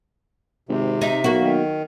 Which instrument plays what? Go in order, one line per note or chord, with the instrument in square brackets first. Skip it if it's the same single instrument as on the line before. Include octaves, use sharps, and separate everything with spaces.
[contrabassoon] G#1 [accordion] C3
[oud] D#4 [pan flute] E5
[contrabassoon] B1 [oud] A#3 F#4
[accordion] D#3